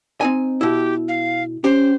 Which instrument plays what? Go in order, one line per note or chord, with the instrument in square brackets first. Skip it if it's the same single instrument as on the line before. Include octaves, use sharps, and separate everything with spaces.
[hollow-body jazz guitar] C4 D#4 G#5
[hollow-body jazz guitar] B2 E4 [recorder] G4
[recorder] F5
[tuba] C#4 [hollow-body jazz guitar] G4 [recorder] C5